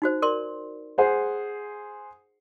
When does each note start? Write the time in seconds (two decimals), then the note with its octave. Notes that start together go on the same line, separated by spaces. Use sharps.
0.02 D#4 F#4 C5
0.22 A#4 D5 C6
0.98 G#4 C5 F#5